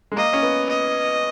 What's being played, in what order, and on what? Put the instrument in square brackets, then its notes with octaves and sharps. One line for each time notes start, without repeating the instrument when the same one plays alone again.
[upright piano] G#3
[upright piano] A#3 [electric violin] D#5
[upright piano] C#4
B3
[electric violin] D#5